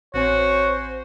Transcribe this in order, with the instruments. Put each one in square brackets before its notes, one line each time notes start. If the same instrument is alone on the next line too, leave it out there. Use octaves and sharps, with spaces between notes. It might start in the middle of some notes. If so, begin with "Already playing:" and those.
[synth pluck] A1 C4 G#5 [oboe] F#4 [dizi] C5 [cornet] C#5